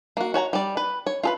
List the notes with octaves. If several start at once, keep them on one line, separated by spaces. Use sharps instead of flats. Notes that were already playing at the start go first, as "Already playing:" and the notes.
A#3 F#4
F#4 C#5 G#5 A#5
G3 D5
B4
C#5
F4 A4 B4